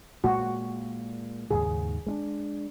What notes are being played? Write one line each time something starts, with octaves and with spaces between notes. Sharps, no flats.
A#2 G#3 A#3 F#4
D#2 G#2 C#3 G#4
G#3 C#4 D4